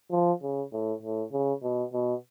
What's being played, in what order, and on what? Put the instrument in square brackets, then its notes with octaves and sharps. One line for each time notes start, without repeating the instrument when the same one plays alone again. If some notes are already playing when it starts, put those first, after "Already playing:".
[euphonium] F3
C#3
A2
A2
C#3
B2
B2